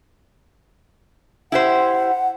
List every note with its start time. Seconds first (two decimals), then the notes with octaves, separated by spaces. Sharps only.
1.52 E4 G4 C5 F#5